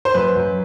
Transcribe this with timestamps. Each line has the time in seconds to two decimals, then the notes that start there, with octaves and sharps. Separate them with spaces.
0.05 C5
0.14 F#2 B4
0.36 F#2